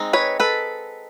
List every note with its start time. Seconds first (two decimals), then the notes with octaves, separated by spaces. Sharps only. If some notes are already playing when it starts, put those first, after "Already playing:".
Already playing: G#3 C4 D#4
0.13 B4 C#5
0.40 A4 B4